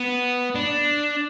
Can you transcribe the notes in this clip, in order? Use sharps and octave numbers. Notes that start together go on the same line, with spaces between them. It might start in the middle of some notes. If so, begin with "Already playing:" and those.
Already playing: B3
D4